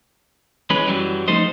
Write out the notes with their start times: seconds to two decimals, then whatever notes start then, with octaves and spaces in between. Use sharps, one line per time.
0.70 E3 G#3 C#4 B4
0.87 F#2 E3 F#3 G3
1.28 F3 A3 D#4 A4 C5 D#5